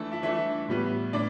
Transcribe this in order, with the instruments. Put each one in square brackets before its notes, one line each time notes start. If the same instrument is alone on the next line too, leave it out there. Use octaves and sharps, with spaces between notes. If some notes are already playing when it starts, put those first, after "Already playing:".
Already playing: [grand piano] E3 A3 D4 A4 A5
E4 E5
E3 A3 D4 E4 E5
A2 G3 B3
A2 D4 D5